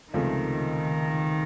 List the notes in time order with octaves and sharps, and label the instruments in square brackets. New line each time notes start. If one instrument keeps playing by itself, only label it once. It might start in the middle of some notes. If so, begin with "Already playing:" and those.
[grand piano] C#2 C3 F3 A3 [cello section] D#3